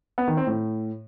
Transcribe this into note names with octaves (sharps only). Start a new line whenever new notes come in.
B3
D#3
C4
A2